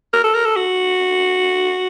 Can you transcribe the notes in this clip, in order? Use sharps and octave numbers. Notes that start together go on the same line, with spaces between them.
A#4
A4
A#4
A4
F#4